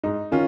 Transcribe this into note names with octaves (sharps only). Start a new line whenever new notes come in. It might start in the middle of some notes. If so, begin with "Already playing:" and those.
G#2 D#4
D#3 C#4 F4